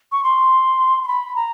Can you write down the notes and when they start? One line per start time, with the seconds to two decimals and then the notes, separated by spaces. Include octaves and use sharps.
0.12 C#6
0.24 C6
1.03 C6
1.08 B5
1.36 A#5